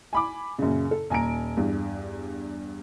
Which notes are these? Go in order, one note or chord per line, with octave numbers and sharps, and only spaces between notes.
G#5 B5 D6
F#2 A#2 C#3
A4
D#1 G#5 A#5 D7
E2 G2